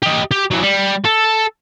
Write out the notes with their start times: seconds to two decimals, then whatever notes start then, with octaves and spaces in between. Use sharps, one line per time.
0.03 G4 D#5
0.31 G4
0.51 E3 F#3
0.63 G3
1.05 A4